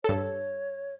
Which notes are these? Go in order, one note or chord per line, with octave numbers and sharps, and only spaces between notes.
G2 A4 C#5